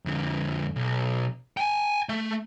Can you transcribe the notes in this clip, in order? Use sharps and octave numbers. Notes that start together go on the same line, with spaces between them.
F2 D3
B1
G5 G#5
A3